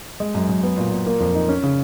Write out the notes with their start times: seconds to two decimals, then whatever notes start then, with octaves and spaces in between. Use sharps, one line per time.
0.20 G#3
0.35 F#2
0.49 F#2
0.63 B3
0.78 A#2
0.92 A#2
1.06 A#3
1.20 F2
1.35 D#4
1.49 C#4
1.63 C#3